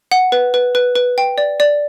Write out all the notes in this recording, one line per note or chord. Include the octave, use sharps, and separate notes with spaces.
F#5
B4
B4
B4
B4
G5
D5
D5